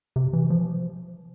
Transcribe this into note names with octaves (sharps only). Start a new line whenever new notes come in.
C3
E3
F3